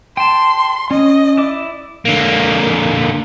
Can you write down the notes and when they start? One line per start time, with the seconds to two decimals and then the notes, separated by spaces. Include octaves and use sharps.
0.17 G5 A5 C6
0.91 C#4 D#5
1.37 E4 D5 D6
2.05 D3 A#3